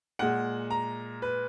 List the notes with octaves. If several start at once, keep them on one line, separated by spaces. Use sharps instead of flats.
A#2 G#3 F#5
A#5
B4